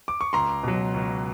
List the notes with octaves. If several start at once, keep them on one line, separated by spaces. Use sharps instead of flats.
D6
C#6
C#2 A#5 C6
B2 F#3
C#2